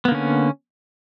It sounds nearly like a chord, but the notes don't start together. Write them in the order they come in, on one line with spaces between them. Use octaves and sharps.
B3 A#3 D3 C#4